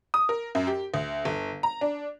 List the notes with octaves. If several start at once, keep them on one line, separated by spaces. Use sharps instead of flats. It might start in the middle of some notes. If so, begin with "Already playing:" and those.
D#6
A#4
F#2
G4
D2
G1
A#5
D4